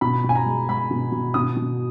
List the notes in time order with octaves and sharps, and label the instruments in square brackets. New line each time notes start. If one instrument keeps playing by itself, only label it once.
[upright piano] B2 B5
B2
G#5
A#5
G#3
G#3 B5
B2
B2
B2 D#6
B2